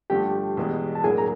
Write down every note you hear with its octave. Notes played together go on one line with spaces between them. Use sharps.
G2 D3 F3 A3 G4 G5
E2 B2 G#3
A5
A2 F#3 A#3 D4 G#4 G#5
A#5